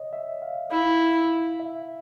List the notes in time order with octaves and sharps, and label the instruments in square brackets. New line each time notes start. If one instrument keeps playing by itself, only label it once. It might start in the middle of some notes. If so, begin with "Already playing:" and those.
Already playing: [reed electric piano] C#5 D#5
E5
F5
[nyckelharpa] E4 [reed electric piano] F5
[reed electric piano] E5